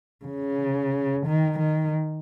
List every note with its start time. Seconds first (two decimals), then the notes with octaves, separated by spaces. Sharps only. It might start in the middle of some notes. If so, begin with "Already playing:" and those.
0.26 C#3
1.26 D#3
1.59 D#3